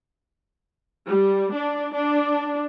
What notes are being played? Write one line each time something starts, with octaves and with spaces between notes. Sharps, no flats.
G3
D4
D4